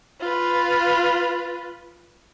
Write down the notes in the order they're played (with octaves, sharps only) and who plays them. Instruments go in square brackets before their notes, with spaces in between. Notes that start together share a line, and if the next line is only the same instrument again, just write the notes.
[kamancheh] F4 B4